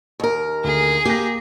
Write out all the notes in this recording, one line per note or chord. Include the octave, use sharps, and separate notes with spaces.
D#2 A#4
D2 G#4
A#3 G4 A#6